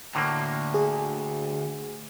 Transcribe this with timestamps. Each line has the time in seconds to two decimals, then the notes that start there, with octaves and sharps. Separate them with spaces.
0.15 D2 A2 D3 A#3
0.74 G#4